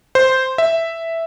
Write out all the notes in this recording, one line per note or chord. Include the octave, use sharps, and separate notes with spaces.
C5
E5